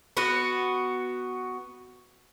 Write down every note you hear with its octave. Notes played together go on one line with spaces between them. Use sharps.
B3 F#4